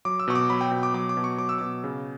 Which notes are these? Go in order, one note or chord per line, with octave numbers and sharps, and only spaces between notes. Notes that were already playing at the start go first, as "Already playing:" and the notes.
F#3 D6
E6
B2 C#6
D6
F#3 B5
G5
B2
D6
F#3 D6
D6
B2
C#6
F#3 D6
E6
B2 D6
C#3